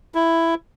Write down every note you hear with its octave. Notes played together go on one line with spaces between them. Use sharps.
E4